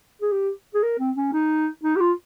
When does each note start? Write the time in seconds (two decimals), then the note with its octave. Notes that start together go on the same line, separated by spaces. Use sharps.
0.22 G#4
0.32 G4
0.75 G#4
0.83 A#4
0.99 C4
1.16 C#4
1.33 D#4
1.84 D#4
1.96 G4
2.00 F4